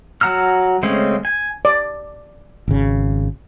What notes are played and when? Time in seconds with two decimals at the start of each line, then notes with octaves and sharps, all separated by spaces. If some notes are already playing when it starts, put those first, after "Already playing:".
0.21 F#3 F#5 A#5 E6 F6
0.83 C#3 G#3 A3 C4 C#4
1.25 G#5
1.65 D5
2.68 G#1 C#3